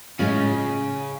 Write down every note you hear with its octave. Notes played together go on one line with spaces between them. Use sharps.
A2 C#3 G#3 C#4 F4